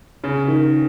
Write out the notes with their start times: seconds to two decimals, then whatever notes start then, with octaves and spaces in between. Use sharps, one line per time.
0.24 C#3
0.48 D#3